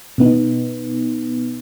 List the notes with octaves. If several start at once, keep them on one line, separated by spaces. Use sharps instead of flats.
B2 B3 D#4